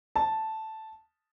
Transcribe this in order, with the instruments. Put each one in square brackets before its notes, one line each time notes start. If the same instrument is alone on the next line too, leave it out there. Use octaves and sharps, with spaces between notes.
[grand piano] A5